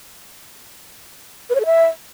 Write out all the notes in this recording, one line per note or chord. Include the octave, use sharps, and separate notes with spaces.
B4
C#5
A4
E5